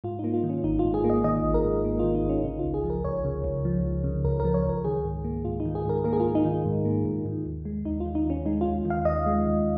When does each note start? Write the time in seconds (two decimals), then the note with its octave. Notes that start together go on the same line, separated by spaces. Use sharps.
0.04 G#2 F4
0.19 A#3 D#4
0.34 F4
0.43 D#3
0.49 C#4
0.63 G#1 D#4
0.79 G#2 F4
0.94 G#4
1.04 A#3
1.10 D#5
1.24 D#3 D#5
1.44 G#1
1.54 A#4
1.65 G#2
1.85 A#3
1.99 D#3 F4
2.15 D#4
2.24 G#1
2.29 C#4
2.44 C#3 D#4
2.59 C#2 F4
2.74 G#4
2.84 F3
2.90 A#4
3.05 C#2 C#5
3.25 C#3
3.44 C#2
3.65 F3
3.84 C#2
4.04 C#3
4.25 C#2 A#4
4.40 F3 A#4
4.54 C#5
4.65 C#2 A#4
4.84 D#3 G#4
5.05 G#2
5.24 A#3
5.45 G#2 F4
5.60 D#4
5.65 D#3
5.75 G#4
5.86 G#2 A#4
6.04 A#3 A#4
6.13 G#4
6.20 F4
6.25 G#2
6.35 D#4
6.45 D#3
6.65 G#2
6.85 A#3
7.05 G#2
7.26 D#3
7.46 D#2
7.65 G#3
7.85 D#2 D#4
8.00 F4
8.06 D#3
8.15 D#4
8.26 D#2 C#4
8.45 G#3 D#4
8.61 D#2 F4
8.85 D#3
8.90 F5
9.05 D#2 D#5
9.26 G#3
9.46 D#2